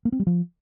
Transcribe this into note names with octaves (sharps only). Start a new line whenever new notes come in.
A#3
C4
G3
F3